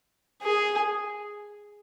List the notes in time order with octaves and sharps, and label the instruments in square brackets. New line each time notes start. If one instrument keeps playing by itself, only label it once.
[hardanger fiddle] G#4